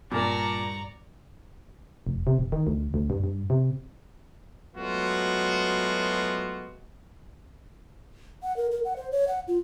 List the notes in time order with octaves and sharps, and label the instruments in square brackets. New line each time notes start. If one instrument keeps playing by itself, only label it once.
[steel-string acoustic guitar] G2 [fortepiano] A#2 A#3 [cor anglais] D4 [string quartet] D5 A#5 C#6
[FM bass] F1
C3
E1
D#3
D2
D2
G2
G2
C3
[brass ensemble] F#3 G#3 A3 B3 F4 F#4
[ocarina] F#5
A#4
A#4
F#5
C5
C#5
F#5
F4